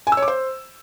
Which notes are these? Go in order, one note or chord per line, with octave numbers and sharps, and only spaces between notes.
G#5
E6
C#5
D6
C5